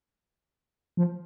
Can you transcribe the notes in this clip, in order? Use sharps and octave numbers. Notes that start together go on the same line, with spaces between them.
F3